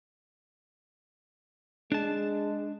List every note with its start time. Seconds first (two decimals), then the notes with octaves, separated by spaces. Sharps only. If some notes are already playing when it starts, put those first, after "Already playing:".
1.92 G#3 D4 A5